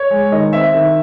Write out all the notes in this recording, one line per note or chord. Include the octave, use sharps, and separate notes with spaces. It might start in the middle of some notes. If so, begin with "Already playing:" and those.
Already playing: C#5
G#3
D#3 D#5
C4 E5
D#3